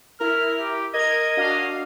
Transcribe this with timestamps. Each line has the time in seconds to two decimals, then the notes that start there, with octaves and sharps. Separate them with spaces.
0.21 E4 A#4 F6
0.59 G4
0.94 A#4 D#5 D#6 G#6
1.37 D4 F#4 F5